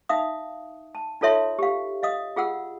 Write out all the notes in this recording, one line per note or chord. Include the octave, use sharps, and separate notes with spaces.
D#4 E5 F5 D#6
A5
D#4 F4 A4 C#5 E5 C6
G4 F5
D#5 F5 D#6
F4 G#4 F#5 E6